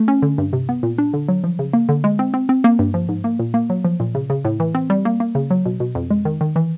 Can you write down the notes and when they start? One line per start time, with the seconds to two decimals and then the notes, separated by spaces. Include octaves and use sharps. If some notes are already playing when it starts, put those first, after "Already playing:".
Already playing: A3
0.08 C#4
0.22 D3
0.38 G2
0.53 C3
0.69 B3
0.83 A#2
0.98 D4
1.14 D3
1.28 F#3
1.44 F3
1.59 C#3
1.73 A#3
1.89 D3
2.04 G#3
2.19 C4
2.34 C4
2.49 C4
2.64 A#3
2.79 G2
2.94 F3
3.09 G#2
3.24 A#3
3.39 A#2
3.54 A#3
3.70 F#3
3.85 F3
4.00 A#2
4.15 C#3
4.30 C#3
4.45 A2
4.60 E3
4.75 C4
4.90 G3
5.05 A#3
5.20 A#3
5.35 C#3
5.50 F#3
5.66 B2
5.80 B2
5.95 F2
6.10 G#3
6.25 D#3
6.41 D#3
6.56 E3